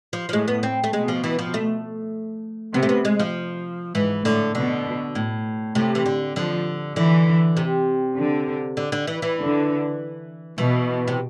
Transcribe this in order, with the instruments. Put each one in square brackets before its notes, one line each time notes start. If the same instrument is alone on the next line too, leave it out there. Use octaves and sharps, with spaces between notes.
[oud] F3
F3
[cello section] A2 [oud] G#3
[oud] B3
C4
A3
[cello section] B2 [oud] G#3
[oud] F3
E3
F3
A3
[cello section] C3 [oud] B3
[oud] A3
B3
G#3
F3
[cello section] G#2 [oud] E3
[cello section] A2 [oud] D3
[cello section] B2 [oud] D3
[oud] A2
[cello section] A2 [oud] C3
[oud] E3
D3
[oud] D3 [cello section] F3
[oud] D3 [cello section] E3
[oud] C3
[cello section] D3
[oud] D3
D3
E3
E3
[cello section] D3
[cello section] B2 [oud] E3
[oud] C3